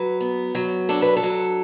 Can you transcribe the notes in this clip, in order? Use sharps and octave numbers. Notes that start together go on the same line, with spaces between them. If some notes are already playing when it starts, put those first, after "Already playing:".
Already playing: F#3 B4
B3
F#3
D4 A4
B4
A4
F#3